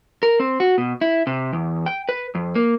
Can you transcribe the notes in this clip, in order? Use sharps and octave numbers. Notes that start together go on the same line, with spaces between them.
A#4
C4
F#4
B2
E4
C3
E2
G5
B4
F2
A#3